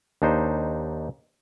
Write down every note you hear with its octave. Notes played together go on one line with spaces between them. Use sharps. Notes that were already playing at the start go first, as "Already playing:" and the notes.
D#2 D4 D#4 C5